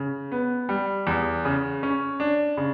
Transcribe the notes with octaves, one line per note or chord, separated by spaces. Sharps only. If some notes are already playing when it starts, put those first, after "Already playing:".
Already playing: C#3
B3
G3
E2
C#3
C#4
D4
C#3